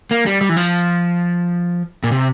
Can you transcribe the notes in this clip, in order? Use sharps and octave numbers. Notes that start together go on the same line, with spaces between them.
A#3
G3
G3
E3
F3
A#2
C3